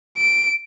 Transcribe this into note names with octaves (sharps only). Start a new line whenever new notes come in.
D7